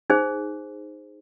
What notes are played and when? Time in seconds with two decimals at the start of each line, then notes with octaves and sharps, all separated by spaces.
0.10 D#4 G#4 C5